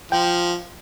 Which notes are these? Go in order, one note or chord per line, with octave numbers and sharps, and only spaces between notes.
F3 G5